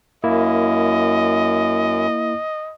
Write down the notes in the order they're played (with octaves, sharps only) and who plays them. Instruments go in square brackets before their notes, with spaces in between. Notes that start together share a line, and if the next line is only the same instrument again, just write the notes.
[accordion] F#2 [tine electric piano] A#3 E4 [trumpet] D#5